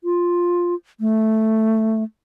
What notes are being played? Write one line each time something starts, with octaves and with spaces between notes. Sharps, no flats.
F4
A3